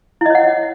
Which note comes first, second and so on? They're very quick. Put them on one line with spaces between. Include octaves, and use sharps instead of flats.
E4 D#5 C#5 F#5